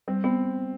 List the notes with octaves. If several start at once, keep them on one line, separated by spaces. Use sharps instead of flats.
G3 C4
B3 C4